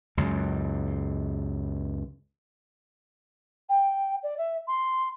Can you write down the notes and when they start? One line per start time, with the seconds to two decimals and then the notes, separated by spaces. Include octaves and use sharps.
0.17 C#2 F#2
3.69 G5
4.23 D5
4.38 E5
4.67 C6